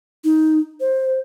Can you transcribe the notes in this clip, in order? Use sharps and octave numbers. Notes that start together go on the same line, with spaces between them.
D#4
C5